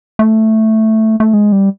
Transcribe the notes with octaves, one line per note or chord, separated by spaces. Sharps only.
A3
A3
G#3
G3